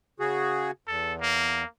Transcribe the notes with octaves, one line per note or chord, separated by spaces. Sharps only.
C#3 F#4 G#4
E2 A4
A#3